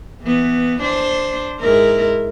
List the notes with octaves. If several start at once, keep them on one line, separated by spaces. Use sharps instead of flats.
E3 B3
D4 C5
G#2 E4 A#4